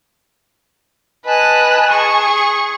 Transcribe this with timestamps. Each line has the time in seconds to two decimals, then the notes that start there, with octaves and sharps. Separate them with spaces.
1.25 B4 D#5 G#5 A5 F#6
1.90 G#4 C#6